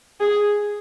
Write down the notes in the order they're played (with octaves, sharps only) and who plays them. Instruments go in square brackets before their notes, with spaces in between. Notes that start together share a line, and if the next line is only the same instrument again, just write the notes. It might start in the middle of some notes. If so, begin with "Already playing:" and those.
[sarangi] G#4